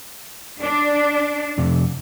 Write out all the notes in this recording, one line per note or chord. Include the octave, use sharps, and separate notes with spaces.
D4
F2 C3